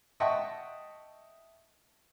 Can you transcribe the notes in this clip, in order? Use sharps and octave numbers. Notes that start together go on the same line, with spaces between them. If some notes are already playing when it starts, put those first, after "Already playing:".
D#5 E5 F#5 G5 A5 C#6